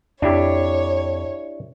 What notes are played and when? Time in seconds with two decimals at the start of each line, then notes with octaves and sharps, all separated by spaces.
0.22 F2 D4 E4 G4 C#5